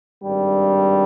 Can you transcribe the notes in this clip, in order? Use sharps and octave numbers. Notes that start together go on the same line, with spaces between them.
G#1 G2 G3